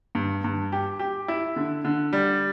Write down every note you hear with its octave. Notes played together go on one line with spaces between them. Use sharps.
G2
G2
G4
G4
E4
D3
D3
G3